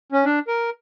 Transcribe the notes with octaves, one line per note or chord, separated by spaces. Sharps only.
C#4
D4
A#4